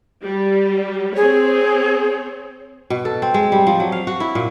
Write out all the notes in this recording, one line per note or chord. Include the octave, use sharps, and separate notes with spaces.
G3
C4 G#4 C#5
B2
A4
C4
G#3
G3
F3
F#3
F5
F#4
E4
A#2